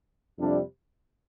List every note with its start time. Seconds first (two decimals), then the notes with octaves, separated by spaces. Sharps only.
0.38 F2 C3 G3 D4